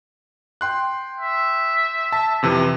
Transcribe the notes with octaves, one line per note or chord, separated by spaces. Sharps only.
G5 C6 F#6
E5
A5
F2 C3 E3